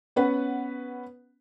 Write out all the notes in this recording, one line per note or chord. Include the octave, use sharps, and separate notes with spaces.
B3 C#4 B4 F#5